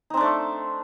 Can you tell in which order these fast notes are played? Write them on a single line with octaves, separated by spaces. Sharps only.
D#4 C4 D4 A3